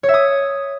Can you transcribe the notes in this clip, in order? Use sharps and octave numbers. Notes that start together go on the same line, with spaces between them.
C#5
E5
D#6